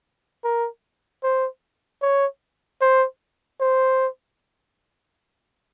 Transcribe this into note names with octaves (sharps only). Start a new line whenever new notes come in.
A#4
C5
C#5
C5
C5